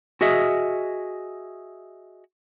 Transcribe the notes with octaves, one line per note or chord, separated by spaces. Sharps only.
F#4 G#4 D#5 E5